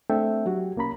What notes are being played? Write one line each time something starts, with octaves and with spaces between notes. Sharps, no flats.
A3 C4 D4 A4 E5 G5
F#3 F#4 G4
C2 A#3 C#4 A#5 B5